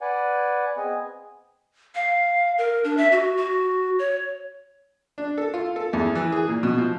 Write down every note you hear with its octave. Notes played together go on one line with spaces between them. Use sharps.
B4 D5 F#5 G#5
B3 C4 G#4 D#5 G#5
F5
A#4
D4
E5
F#4
F#4
C#5
D4
A4
F4
A4
E2
E3
G#4
A#2
B2
F3